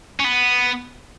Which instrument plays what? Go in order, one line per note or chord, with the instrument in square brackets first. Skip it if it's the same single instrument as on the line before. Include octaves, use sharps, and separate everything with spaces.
[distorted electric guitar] C#4
B3